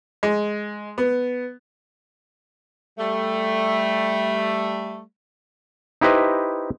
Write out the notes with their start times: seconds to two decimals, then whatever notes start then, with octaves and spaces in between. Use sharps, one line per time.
0.23 G#3
0.98 B3
2.99 G3 A3
6.01 D#4 E4 G4 B4 C5 D#5